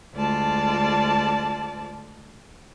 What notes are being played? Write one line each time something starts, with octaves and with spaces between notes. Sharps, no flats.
D2 G#3 F4 D5 A5